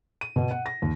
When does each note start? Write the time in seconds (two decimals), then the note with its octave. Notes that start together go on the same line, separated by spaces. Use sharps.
0.21 D#7
0.36 B2
0.51 F#5
0.66 A#6
0.82 D#2